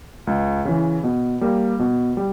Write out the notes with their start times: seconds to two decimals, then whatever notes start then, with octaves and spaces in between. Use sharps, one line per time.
0.27 C#2
0.65 C#3 E3
1.04 B2
1.41 G3 A#3
1.79 B2
2.17 G3